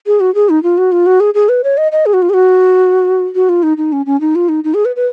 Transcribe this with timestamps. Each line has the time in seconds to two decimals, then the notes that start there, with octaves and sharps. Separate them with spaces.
0.07 G#4
0.20 F#4
0.35 G#4
0.49 D#4
0.63 F4
0.78 F#4
0.92 F4
1.06 F#4
1.20 G#4
1.34 G#4
1.49 B4
1.64 C#5
1.78 D#5
1.92 D#5
2.06 G#4
2.14 F#4
2.22 F4
2.30 G#4
2.34 F#4
3.35 F#4
3.49 F4
3.63 D#4
3.77 D#4
3.92 C#4
4.06 C#4
4.21 D#4
4.35 F4
4.49 D#4
4.64 D#4
4.74 G#4
4.85 B4
4.96 B4